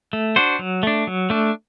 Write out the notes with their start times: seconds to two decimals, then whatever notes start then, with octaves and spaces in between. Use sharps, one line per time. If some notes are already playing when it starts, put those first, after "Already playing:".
0.13 A3
0.36 D4 F#4 C5
0.59 F#3
0.83 A3 D4
1.07 F#3
1.30 A3 D4